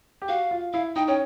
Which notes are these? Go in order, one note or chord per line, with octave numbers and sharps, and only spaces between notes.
G4
F#4 F5
F4
E4 F5
D#4 G5
C#4 G5